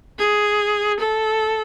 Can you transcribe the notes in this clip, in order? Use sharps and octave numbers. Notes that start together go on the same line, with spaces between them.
G#4
A4